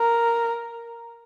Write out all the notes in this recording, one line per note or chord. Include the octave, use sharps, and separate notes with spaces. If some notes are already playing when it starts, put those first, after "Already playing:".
Already playing: A#4